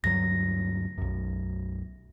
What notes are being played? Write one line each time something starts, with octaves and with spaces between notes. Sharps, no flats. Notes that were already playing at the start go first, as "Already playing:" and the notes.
D2 G2 F#3 A#6
B1 F#2